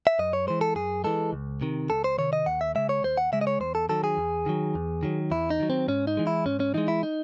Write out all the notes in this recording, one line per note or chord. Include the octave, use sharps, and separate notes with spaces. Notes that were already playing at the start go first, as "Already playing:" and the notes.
E5
F#2 D#5
C#5
E3 G#3 C5
A4
F#2 G#4
E3 G#3 A4
C#2
C3 D#3
C#2 A4
C5
C3 D#3 C#5
D#5
D#2 F#5
E5
C#3 G#3 E5
C#5
D#2 C5
F#5
C#3 G#3 E5
D#5
C#5
E2 C5
A4
D#3 F#3 A4
G#4
E2
D#3 F#3
E2
D#3 F#3
E2 E4
D#4
D#3 F#3
C4
G#2 C#4
D#4
E3 G#3
E4
G#2 C#4
C#4
E3 G#3 D#4
E4
D#4